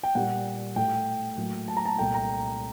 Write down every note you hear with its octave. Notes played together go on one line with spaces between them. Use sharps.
G5
A#2 G3 A#3 F#5
A2 A3 G5
A2 F#3 A#3
A5
A#5
A5
C2 A#2 A3 G5
A#5